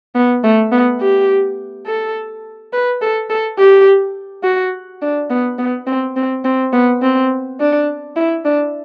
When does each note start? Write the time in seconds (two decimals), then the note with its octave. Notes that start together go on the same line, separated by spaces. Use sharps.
0.15 B3
0.44 A3
0.72 B3
1.01 G4
1.86 A4
2.73 B4
3.02 A4
3.30 A4
3.59 G4
4.44 F#4
5.02 D4
5.30 B3
5.58 B3
5.87 C4
6.16 C4
6.45 C4
6.73 B3
7.02 C4
7.60 D4
8.17 E4
8.45 D4